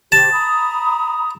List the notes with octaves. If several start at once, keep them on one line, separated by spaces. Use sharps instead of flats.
G4 C5 A5
A#5 B5 D#6